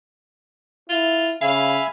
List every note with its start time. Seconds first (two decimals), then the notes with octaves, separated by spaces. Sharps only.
0.90 E4 F4
1.41 C#3 E5 F5 G#5 B5